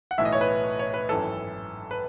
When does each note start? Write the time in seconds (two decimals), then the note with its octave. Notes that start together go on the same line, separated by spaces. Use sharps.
0.11 F#5
0.18 B1 A2 E3 E5
0.25 D#5
0.33 C#5
0.41 B4
0.79 C#5
0.94 B4
1.09 G#1 F#2 E3 A4
1.91 B4